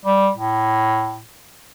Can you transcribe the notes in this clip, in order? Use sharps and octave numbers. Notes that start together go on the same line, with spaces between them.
G3
A2